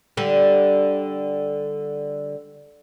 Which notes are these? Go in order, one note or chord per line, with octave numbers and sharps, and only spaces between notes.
D3 G3